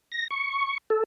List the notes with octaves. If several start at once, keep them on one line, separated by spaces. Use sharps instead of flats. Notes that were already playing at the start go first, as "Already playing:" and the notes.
A#6
C#6
A4